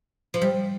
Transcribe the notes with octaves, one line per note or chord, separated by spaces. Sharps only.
F3
G3